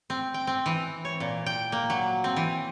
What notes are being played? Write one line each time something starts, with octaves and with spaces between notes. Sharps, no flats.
C4
G5
C4
E3
C#5
A#2
G5
A#3
F#3
C4
E3